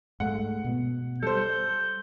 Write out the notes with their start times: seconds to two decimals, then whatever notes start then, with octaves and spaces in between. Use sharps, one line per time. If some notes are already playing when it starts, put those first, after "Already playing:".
0.20 G#2 A3 F#5
0.64 B2 B3
1.23 G3 A4 C5 G6